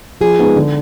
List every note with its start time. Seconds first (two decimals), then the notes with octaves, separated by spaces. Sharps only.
0.20 F3 G#4
0.39 G#3 B3 D#4
0.56 D3